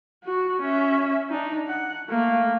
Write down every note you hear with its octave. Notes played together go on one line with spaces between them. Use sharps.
F#4
C#4 E5
D4 D#4
F#5
A3 A#3